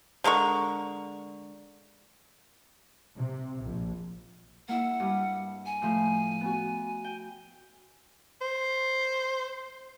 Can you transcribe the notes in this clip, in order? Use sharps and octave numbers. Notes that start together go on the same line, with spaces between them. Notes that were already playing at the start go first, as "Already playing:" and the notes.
D3 G#3 A#4 C#6
C3
A#1
A#3 E4 F#5 E6
G2 G3
G#5
A2 F3 A3
B3 F#4
G5
C5